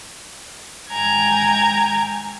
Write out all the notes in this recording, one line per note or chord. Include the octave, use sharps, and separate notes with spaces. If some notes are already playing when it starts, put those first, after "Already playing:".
G#2 G5 G#5 A#5 G#6